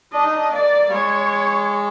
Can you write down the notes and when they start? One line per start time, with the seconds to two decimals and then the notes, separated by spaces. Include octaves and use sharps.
0.13 D4 D#5
0.23 D#4
0.35 D4
0.52 A#3 D5
0.88 G3
0.92 G#3 C#5